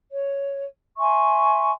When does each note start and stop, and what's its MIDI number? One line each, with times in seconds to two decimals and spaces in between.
0.11 0.64 73
0.98 1.71 76
0.98 1.71 80
0.98 1.71 84
0.98 1.71 85